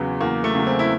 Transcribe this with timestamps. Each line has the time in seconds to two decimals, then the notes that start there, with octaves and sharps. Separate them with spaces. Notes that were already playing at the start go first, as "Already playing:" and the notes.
Already playing: E2 C#3 F#3 B3
0.21 E2 A#3
0.44 A3
0.55 C#3 F#3
0.67 C4
0.79 E4